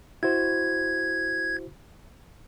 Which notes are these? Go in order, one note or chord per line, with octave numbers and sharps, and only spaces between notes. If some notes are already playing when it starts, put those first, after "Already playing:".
E4 F#4 C5 G#6